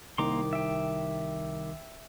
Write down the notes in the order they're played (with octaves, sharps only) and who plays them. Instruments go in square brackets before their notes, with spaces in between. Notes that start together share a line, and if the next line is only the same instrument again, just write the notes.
[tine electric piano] C2 D#3 D6 [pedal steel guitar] A#3 A#5 C6
[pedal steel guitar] E5 G5